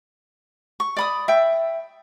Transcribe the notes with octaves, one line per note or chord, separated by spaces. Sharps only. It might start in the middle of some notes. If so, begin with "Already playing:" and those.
C#6
D5 B5 D#6
E5 G5